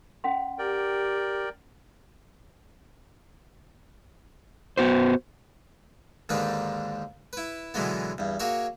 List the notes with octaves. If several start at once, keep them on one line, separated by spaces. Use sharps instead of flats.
C#4 F#5 C6
G4 A#4 D5 G5
B3 F#4 C5
D#2 G#2 D3 D#3 D4 B4
E4 B4
B2 D3 E3 F#3 G#3 B3
E2 G2
A#3 F#4 G#4 C#5 E5